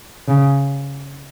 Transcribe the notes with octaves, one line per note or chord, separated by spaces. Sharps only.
C#3